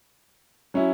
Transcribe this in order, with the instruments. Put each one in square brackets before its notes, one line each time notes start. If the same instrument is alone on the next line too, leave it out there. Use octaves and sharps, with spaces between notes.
[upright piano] F#3 C#4 E4